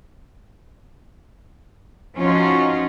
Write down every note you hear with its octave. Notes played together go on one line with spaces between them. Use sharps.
F3 C#4 D#4 F4 F#4